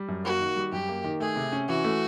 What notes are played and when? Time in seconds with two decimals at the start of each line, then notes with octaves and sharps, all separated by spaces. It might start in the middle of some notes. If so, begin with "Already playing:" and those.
Already playing: G3
0.08 F#2
0.24 A#3 F#4
0.40 D#3
0.56 G3
0.72 F#2 G4
0.88 A#3
1.04 D#3
1.20 A3 G#4
1.36 C3
1.52 C#4
1.68 E3 F#4
1.84 A3